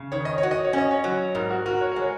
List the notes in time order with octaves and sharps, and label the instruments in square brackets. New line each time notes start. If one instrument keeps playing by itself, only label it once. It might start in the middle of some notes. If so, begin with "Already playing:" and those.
Already playing: [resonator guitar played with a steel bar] C#3
[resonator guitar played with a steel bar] D#3 [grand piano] C#5
[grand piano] D#5
C#5
[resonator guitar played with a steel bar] F#4
[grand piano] D#5
C#5
[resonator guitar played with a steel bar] C#4 [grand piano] D#5
[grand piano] C#5
[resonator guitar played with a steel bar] F#3
[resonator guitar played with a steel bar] G#2 [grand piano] A#4
[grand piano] F#4
[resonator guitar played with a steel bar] F#4 [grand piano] A#4
[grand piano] C#5
[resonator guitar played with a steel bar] G#3 [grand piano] A#4
[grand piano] C#5